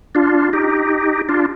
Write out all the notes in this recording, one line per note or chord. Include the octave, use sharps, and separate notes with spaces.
D4 F4
D#4 G4
D4 F4